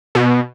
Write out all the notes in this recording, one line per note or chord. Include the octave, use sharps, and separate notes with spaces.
B2